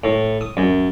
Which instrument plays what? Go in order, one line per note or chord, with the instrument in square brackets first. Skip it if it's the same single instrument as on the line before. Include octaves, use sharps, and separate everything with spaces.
[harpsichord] A2
D#6
F#2